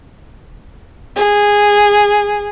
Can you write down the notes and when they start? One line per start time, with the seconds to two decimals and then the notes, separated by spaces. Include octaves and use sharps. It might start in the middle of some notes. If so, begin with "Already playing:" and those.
1.17 G#4